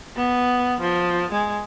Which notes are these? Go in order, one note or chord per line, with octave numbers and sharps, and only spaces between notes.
B3
F3
G#3